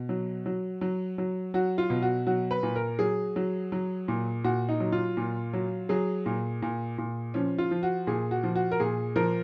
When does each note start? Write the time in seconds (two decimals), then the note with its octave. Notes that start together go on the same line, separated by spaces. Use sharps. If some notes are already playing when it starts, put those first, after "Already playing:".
Already playing: B2
0.09 F#3
0.46 F#3
0.81 F#3
1.18 F#3
1.54 F#3 F#4
1.78 F4
1.90 B2
2.03 F#4
2.27 F#3 F#4
2.51 B4
2.63 A#2
2.76 A#4
2.99 F#3 G#4
3.36 F#3
3.72 F#3
4.08 A#2
4.44 A#2 F#4
4.69 D#4
4.80 F#3
4.92 F4
5.17 A#2
5.53 F#3
5.89 F#3 G#4
6.26 A#2
6.62 A#2
6.98 A#2
7.34 F3 C#4
7.58 F4
7.71 F3
7.83 F#4
8.07 A#2 G#4
8.31 F#4
8.44 F3
8.56 F#4
8.71 A#4
8.80 A#2 G#4
9.16 F3 A#4